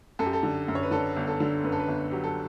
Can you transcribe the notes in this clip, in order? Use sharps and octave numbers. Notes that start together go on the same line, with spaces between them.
F#2 A4
G4
A4
D3
F#2
C#5
B4
D3 A4
G1
A4
D3
F#2 B4
A4
B4
G1
F#3 G4
A4